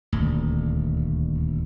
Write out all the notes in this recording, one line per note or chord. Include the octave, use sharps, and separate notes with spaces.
D#1 D2